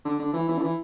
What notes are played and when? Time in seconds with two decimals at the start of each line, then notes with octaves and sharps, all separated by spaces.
0.05 D3
0.19 D3
0.33 E3
0.48 E3
0.58 D3
0.63 E3